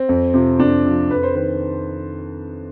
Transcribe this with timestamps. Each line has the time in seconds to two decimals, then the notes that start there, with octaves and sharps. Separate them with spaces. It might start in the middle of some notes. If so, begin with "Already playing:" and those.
Already playing: C4
0.09 F2
0.34 C3 F3
0.59 F2 D4
0.85 C3 F3
1.10 F2 B4
1.23 C5
1.35 D#3 B4